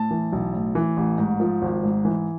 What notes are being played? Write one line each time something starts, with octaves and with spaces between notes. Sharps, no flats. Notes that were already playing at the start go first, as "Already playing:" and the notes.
Already playing: A2 A5
E3
B1
A2
E3
A1
G#2
F3
G#1
G#2
E3